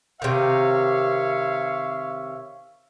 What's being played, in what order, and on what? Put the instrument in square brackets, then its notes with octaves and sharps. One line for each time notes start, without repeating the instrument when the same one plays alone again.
[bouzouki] C3 D#3 [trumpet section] C#5 E5 F5